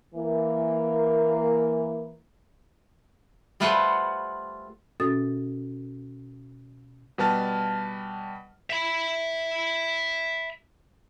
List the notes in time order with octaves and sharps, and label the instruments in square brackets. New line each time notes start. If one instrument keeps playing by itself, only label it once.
[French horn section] E3 A#3
[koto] G3 A3 F4 B4 C5 F#5
[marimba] B2 C#4 F#4 A4 D#6 A6
[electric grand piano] B2 G3 B4 A5 F6
[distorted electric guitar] E5 B5